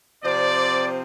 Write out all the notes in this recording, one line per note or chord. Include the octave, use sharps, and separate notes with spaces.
C3 F3 C4 D5